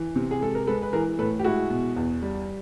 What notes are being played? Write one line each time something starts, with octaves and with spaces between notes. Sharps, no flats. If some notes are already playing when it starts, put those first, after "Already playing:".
Already playing: E3
C3
G#4
G#3 A4
A#4
G#3 A4 B4
B4
E3 G#4 A#4
A2 A4 B4
G4
G#3 E4 F#4
B2
E2
G3